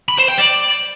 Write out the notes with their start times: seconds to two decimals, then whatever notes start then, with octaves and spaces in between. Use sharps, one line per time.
0.08 B5
0.18 C5
0.28 G5
0.38 D5